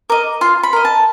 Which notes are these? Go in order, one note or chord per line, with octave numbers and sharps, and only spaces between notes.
A#4 D#5 D6
F4 C6
B5
A#4 D#5
A5